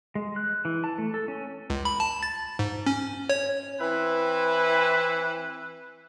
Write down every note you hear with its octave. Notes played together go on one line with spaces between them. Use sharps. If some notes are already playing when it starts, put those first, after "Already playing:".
G#3
F#6
E3
A5
A3
A4
C#4
C#2
B5
A5
A6
G#2
C#4
C#5
E3 C4 E4 B4